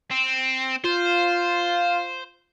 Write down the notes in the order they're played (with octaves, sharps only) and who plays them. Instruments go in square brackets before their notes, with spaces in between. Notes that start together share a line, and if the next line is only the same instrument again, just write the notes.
[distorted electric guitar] C4
[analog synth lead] F4 [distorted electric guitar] C5